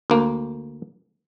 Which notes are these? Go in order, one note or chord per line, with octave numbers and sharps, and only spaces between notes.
D2 A#3